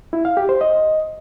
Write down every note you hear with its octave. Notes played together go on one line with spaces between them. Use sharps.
E4
F5
G4
C5
D#5